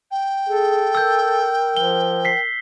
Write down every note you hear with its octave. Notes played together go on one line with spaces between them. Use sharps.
G5
G#4 A4
A#4 E6 G6
F3 G7
B6 C7